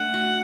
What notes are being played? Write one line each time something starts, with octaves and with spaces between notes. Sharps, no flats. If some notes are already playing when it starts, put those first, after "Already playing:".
Already playing: A3 D4 F#5
F#4